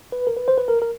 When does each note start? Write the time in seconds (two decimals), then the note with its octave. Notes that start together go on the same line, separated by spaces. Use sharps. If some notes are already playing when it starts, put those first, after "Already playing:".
0.12 B4
0.27 A#4
0.37 B4
0.48 C5
0.58 B4
0.68 A#4
0.82 A#4